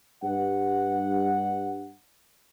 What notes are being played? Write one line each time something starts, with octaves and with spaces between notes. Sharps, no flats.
G2 F#5